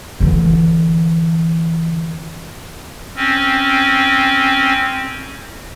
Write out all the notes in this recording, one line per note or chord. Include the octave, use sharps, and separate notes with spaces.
D3 E3
C4 C#4